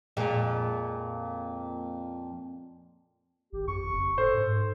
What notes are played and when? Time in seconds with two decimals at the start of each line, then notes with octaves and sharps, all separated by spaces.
0.17 F2 A#2 G#3
3.53 G#1 G4
3.68 F2 C#6
3.93 F#1
4.18 A2 A4 C5
4.37 G#2